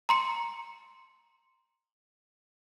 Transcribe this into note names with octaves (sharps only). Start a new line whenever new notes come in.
A#5 C6 C#7